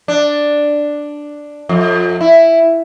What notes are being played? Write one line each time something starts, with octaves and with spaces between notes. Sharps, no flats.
D4
F2
E4